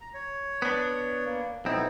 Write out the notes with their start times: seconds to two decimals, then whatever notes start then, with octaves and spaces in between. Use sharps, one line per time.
0.01 A#5
0.14 C#5
0.62 B3 D4
1.26 A#3
1.65 B1 B3 C4 D#4 E4